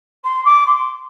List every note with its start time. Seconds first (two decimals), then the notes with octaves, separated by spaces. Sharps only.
0.24 C6
0.45 D6
0.66 C6